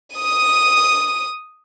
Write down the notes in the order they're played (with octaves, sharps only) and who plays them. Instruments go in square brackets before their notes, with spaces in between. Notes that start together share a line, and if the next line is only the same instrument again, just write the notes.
[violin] D#6 D#7